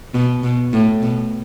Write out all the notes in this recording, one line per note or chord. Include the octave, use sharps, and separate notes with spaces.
B2
B2
A2
B2